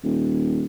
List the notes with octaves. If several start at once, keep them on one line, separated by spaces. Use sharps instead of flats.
D#1